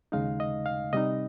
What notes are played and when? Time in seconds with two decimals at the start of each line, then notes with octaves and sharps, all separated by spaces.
0.12 D#2 C#3 G#3 D#4 F5
0.40 D#5
0.66 F5
0.93 C3 G3 C4 D#4 D#5